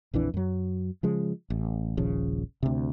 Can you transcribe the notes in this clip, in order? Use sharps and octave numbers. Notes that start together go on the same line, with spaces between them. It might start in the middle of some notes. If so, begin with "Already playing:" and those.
A#1 F2 E3 D4
F#2 F#3
C#3 F3 G#3
A1
D#1 A#1 C#3 F3
D2 C3